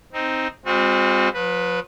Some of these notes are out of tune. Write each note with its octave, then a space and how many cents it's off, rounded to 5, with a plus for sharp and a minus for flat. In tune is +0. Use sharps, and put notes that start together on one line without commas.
C4 +0 D#4 +0
G#3 -40 C4 +0 F#4 -45
F3 +45 B4 +0